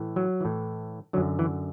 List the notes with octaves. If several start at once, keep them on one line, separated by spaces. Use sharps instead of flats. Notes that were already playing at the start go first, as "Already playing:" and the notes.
Already playing: A2 E3
F#3
A2 E3
F#2 D3 F#3
E3